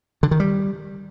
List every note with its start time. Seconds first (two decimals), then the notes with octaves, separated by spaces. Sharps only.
0.23 D3
0.31 D#3
0.40 G3